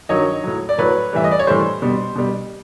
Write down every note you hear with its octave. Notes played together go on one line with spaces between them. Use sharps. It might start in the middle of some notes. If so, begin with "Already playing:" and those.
G2 D#3 F#3 C#5 D#5
A2 F#3
D5
A2 F#3 B4 C#5
A2 E3 G3 E5
D#5
D5
C#5
A2 E3 G3 C5
B2 G3
B2 G3